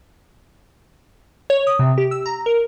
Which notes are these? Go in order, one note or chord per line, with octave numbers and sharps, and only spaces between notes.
C#5
D#6
C3
G4
E6
A#5
A#4